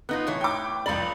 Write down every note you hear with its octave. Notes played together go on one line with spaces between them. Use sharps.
B3 D#4 F4 F#6
A2 E3 C#5
G5 D6
C#2 F3 D5 B5 F#7